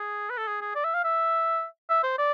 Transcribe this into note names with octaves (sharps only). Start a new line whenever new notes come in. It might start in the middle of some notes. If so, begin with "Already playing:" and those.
Already playing: G#4
B4
A4
G#4
G#4
D5
E5
F5
E5
E5
C5
D5